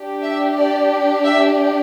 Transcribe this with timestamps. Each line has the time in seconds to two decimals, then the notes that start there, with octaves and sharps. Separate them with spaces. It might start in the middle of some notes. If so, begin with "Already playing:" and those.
Already playing: D4 G4
0.23 E5
0.57 D5
1.25 E5